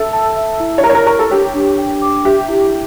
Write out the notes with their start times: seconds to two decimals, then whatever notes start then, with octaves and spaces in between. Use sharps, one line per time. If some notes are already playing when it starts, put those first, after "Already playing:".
Already playing: A4 E5
0.13 A5
0.36 E5
0.60 E4
0.78 C#5
0.83 A#4 A#5
0.89 C#5
0.95 A#4
1.07 A#4 C#6
1.19 A4
1.30 G4 C#5
1.54 D4
1.78 G5
2.02 D6
2.25 G4 E5
2.48 E4